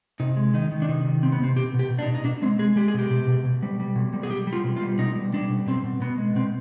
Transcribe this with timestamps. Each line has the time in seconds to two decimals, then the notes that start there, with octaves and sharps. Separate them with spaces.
0.20 C3 D#4
0.37 G#3
0.54 D#3 D#4
0.72 D#3
0.82 D4
0.89 C3 D#4
1.05 D#3
1.22 C3 C4
1.32 B3
1.39 C3 C4
1.56 B2 G4
1.74 B2
1.79 G4
1.90 B2
1.99 D4
2.02 D#4
2.08 B2
2.15 D#4
2.25 B2 D4
2.42 G#3 C4
2.59 G#3 G#4
2.76 G#3 G4
2.88 G#4
2.94 B2 G4
3.11 B2
3.27 B2
3.45 B2
3.63 G3
3.80 G3
3.96 B2
4.13 G3
4.23 G#4
4.30 G3 G4
4.47 G3
4.53 F4
4.64 B2
4.76 F4
4.82 G3
4.98 B2 D#4
5.15 G3
5.33 G3 D4
5.50 B2
5.67 B2 C4
5.84 B2
6.01 B2 B3
6.18 G#3
6.36 B2 C4